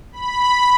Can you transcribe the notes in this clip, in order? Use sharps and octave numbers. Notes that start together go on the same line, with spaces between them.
B5